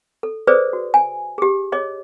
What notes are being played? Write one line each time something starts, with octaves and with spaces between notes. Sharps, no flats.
A4
G#4 A4 B4 C5 D5 D#6
F#4
G#5
G4 G#4
G#4 C#5 D#5